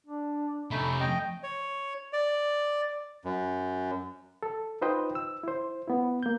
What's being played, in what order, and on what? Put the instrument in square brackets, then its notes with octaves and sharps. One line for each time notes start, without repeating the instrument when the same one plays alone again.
[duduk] D4
[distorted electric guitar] F2 C3 [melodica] A3 D#4 B5 [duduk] C#4
[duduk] A3 [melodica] D#5 G5
[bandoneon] C#5
D5
F#2
[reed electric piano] A4
D#4 F4 B4 C5 D#5 G5
E6
E4 C5
B3 E4
A#3 G6